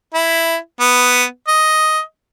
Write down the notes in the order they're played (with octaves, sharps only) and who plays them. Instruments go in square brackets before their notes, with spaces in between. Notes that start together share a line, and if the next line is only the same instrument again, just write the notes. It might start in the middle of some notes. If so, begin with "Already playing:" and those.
[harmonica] E4
B3
D#5